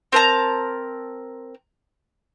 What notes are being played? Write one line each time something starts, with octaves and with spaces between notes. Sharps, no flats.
C4 A#4 A5 A#5